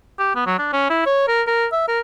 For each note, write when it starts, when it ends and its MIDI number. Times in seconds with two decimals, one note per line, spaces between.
0.19 0.32 67
0.35 0.46 59
0.47 0.56 54
0.59 0.71 62
0.73 0.87 61
0.90 1.02 64
1.06 1.26 73
1.28 1.42 70
1.47 1.66 70
1.72 1.86 76
1.88 2.00 70